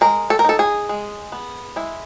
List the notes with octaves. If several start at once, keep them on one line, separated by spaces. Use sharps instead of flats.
G#3 A#4
A4
A#4
D#4 A4
G#4
G#3
B3
G#3 E4